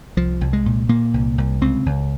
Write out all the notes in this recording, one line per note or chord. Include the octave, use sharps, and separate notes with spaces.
C2 F3
C2
G#3
A#2
A#2 A#3
C2
C2
C#2 C4
C#2